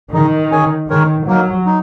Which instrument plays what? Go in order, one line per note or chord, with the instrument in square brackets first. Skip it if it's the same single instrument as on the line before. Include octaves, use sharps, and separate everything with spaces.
[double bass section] D#3 [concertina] D#4 G#4 D#5
[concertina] C#4 G#4 C#5 G#5
[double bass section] D#3 [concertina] G#3 D#4 A#4 C#5
[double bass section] F#3 [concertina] A#3 D#4 A#4
[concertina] D#4